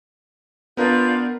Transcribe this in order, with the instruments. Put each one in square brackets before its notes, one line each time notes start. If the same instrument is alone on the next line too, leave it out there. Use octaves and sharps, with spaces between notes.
[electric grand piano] B3 A#4 B4 [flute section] D4 F4 G6